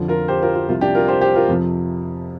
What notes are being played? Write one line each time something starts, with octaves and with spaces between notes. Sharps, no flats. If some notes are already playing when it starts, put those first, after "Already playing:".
Already playing: F2 D3 F3
F4 A#4
G4 C5
F4 A#4
F4
C2 C3 F3 F4
D4 G4
F4 A#4
G4 C5
G4 C5
F4 A#4
F2 C3 F3